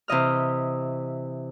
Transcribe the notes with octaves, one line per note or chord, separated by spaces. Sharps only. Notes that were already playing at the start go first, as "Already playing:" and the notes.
C3 E3 D#5 F6